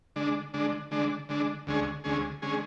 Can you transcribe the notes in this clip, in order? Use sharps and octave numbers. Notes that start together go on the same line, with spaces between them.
D3 G#3 D4
D3 G#3 D4
D3 G#3 D4
D3 G#3 D4
D2 D3 G#3 C#4 G#4
D2 D3 G#3 C#4 G#4
D3 G#3 C#4 G#4